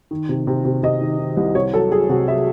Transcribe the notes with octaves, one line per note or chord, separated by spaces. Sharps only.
D#3
C3
C3
C3
C3 D#5
D#3
D#3
C2
C3 C#5
F#3 A4
F#3 G#4
C3 F#4
F#3 E5